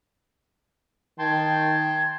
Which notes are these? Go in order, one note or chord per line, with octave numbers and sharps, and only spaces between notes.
D#3 G5 A5 C6 G#6